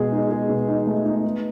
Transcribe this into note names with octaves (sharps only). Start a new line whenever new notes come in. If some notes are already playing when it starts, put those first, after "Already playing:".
Already playing: B2 G#3 G#4
D#4
G#4
B2
D#4
A3
D#4
B3